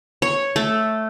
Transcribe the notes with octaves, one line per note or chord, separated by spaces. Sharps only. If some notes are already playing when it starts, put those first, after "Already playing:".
C#5
A3